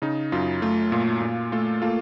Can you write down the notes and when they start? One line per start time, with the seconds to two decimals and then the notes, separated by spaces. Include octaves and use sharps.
0.02 C#3 D#4
0.32 F#2 F4
0.62 A3 F4
0.92 A#2 F4
1.22 A#2 F4
1.52 A3 F4 A4
1.82 A#3 F4 A4